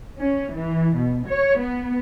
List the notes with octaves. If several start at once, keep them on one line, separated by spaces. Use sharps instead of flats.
C#4
E3
B2
C#5
B3